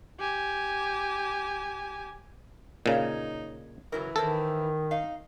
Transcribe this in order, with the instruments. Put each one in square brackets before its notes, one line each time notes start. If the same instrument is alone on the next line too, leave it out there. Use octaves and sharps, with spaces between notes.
[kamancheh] G4 G#5
[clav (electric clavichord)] A#2 C#3 [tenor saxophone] D#4 [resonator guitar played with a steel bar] C#5 F5 A#5
[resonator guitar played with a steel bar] C#3 F#3 A#4 [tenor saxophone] E3
[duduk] D#3 [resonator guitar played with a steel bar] E4 A#4 C5 [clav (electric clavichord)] A4
[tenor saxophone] D#4 [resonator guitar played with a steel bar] F5